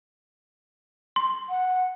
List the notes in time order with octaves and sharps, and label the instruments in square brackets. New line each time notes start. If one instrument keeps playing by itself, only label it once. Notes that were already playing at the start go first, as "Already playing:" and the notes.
[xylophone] C6
[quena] F#5